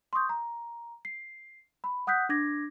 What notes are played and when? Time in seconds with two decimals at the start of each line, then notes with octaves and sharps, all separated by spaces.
0.13 C6 C#6 D#6 G6
0.29 A#5
1.05 C7
1.84 B5
2.07 F#5 D#6 F#6 G6 B6
2.29 D4 D6 G#6 A#6